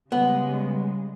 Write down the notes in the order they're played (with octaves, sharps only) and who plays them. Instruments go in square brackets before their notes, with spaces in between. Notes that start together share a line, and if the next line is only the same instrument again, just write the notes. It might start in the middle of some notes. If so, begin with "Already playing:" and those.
[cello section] C#3 G3 G#3 [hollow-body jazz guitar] B3